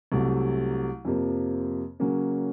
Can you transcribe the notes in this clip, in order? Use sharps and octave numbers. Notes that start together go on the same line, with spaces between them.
C2 C3 F#3 A3
F2 C3 F3 A#3
C#3 F#3 A#3 C#4